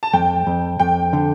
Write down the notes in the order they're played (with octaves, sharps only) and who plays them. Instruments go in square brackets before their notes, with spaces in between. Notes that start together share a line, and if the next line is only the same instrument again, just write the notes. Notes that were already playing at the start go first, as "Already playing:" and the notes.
[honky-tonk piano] A5
[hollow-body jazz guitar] F2 [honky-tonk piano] G5
[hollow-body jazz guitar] F2
[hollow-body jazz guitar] F2 [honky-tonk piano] G5
[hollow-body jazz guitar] D3